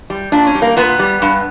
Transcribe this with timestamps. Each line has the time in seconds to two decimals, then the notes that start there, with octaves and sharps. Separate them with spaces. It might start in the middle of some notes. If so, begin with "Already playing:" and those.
0.10 G3
0.32 A#2 D4
0.47 C#4
0.55 G3
0.62 A#3
0.77 A#2 B3
0.99 G3
1.22 G2